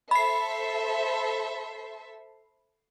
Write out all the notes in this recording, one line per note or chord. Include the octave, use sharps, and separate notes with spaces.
A4 C5 E5 B5 C7